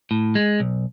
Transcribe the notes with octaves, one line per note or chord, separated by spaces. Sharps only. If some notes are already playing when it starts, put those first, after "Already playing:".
A2
G#3
B1